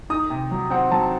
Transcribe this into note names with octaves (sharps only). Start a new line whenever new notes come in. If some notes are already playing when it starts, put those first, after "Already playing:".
D#4 D#6
C3
F#3
C4 F#5
F#3 A5